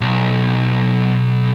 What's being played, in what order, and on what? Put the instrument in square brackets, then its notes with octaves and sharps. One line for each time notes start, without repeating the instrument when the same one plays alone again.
[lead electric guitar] B1